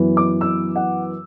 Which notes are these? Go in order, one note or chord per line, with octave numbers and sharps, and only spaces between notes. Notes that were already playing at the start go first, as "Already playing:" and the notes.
Already playing: F#2 E3 B3
D6
E6
F#5